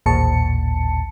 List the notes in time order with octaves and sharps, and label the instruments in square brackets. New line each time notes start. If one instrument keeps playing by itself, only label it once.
[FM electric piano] A1 D#2 A#2 A5 C#7